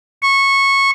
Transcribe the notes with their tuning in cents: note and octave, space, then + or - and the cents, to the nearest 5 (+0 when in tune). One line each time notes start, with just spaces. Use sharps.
C#6 -15